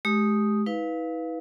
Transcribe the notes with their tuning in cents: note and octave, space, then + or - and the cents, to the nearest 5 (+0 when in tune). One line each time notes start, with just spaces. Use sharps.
G#3 +40 G4 +0 D#6 +0
E4 -45 B4 +0 F5 +0